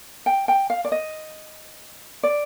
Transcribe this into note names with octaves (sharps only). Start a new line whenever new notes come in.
G5
G5
F5
D5
D#5
D5